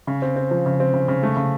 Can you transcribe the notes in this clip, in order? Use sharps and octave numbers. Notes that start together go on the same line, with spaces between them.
C#3
C4
C4
F3
C#3
C4
C#3
C#3
A3
C#3